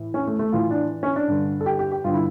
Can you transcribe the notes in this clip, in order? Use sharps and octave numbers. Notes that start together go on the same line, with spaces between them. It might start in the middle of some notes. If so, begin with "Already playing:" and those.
Already playing: A2 E3
C#4
A3
A3
A2 E3 F4
D4
C#4
D4
G2 D3
A4
G4
G4
G4
G2 D3 F4
E4